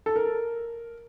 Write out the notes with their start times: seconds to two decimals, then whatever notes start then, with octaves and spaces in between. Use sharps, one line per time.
0.06 A4
0.16 A#4